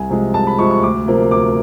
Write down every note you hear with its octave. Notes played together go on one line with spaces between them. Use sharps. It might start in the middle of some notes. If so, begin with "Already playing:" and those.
Already playing: C2 G#5
C3 F3 G#3
C2 A5
B5
C3 F3 G#3 C#6
C#6
D2 D6
C3 F3 A#3
D2 D6